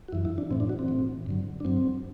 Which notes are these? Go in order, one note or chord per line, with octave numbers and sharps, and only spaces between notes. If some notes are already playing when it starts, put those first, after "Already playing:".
F#4
F#2 E3 E4
E4
D4
A2 E3 C4
D4
F#4
C4
A2 E3
G2 D3 F#3
D4
G2 F#3 C4